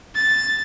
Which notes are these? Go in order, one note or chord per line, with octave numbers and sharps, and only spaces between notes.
A6